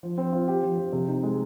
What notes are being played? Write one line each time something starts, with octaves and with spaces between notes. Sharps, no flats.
F3
C4
F4
G4
F3
F3
C3
D#4
G#3